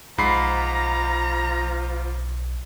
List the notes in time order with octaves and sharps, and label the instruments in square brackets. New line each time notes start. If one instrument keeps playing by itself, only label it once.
[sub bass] B1 [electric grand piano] G#2 B5 C7 [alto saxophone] F3 [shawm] A#5